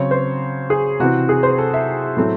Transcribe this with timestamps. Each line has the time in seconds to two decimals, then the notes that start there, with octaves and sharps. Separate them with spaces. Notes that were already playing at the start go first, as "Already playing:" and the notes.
Already playing: C#3 F#3 C4 C#5
0.11 C5
0.70 G#4
1.00 C3 E3 C4 F#4
1.29 G#4
1.43 C5
1.58 A4
1.74 E5
2.16 A2 F#3 A3 C4